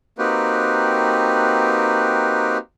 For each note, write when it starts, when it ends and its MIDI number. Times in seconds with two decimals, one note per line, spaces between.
0.19 2.58 58
0.19 2.58 60
0.19 2.58 63
0.19 2.58 66
0.19 2.58 67
0.19 2.58 71